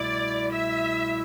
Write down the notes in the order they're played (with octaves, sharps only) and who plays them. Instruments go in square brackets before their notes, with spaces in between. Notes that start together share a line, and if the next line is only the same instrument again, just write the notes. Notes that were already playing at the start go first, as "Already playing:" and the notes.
Already playing: [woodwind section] C2 B2 A3 E4 [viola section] D5
[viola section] E5